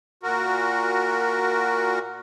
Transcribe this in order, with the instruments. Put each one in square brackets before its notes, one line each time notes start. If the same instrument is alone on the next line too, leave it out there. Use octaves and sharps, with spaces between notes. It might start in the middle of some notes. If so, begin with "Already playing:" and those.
[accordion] A#2 F#4 A#4